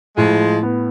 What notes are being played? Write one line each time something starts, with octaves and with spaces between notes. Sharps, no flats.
A2 F3 G#3
B3